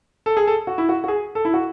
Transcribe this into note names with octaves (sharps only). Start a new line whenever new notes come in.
A4
G#4
A4
F#4
E4
F#4
F#4
G#4
A4
E4
F#4